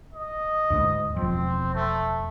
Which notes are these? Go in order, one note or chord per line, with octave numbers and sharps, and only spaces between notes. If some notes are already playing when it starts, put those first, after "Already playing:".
D#5
D2 G#2
E1 F3 C4
A3